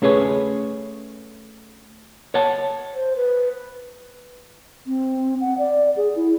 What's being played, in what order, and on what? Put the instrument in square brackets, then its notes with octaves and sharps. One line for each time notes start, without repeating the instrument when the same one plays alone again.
[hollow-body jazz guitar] A3 C#4 G#4 B4 C#5
C#5 F#5 A5
[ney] C5
B4
[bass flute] C4
F#5
D5
G#4
E4